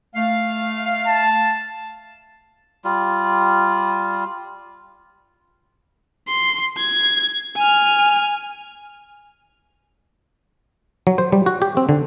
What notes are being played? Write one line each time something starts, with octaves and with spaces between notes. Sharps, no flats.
A3 F5
A5
G3 F4
C6
G#6
G#5 F6
F#3
C5
G3
F#4
G4
C4
D3